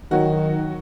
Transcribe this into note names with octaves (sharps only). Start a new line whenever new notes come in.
D#3 F#3 F#4